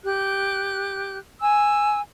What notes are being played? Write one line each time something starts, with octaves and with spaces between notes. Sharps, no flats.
G4 F#6
G#5 E6